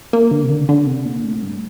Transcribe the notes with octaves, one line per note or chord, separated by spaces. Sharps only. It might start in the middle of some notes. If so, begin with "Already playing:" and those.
A#3
D3
C3
D3
D3
C3
A#2
A2
G2